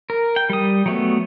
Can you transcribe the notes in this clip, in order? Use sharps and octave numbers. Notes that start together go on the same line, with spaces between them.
A#4
G5
G3 D#6
F#3 A3 B3